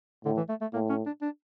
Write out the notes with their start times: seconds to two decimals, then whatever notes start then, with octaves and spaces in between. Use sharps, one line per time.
0.25 A2 D3
0.37 E3
0.49 A3
0.61 A3
0.73 A2 A#3
0.89 C#4
1.06 D4
1.22 D4